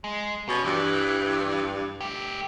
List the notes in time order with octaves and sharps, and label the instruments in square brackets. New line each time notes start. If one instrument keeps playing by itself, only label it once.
[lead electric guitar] G#3
[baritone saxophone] B2 [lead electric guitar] C#4
[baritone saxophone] G2 [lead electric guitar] E3
[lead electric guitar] A3 G4